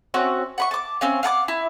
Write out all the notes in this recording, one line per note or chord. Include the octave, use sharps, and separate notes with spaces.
C4 C#4 F#4
F#5 B5 C#6
A5 D6
C4 C#4 F5
F5 F#5 A5 D6
E4